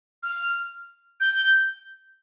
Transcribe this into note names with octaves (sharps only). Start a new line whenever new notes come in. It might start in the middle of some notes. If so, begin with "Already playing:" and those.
F6
G6